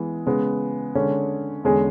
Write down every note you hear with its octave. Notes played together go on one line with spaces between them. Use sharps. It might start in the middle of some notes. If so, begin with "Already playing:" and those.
Already playing: E3 G#3 B3
C#3 G#3 B3
D3 G#3 C#4
E2 D3 G#3 C#4 G#4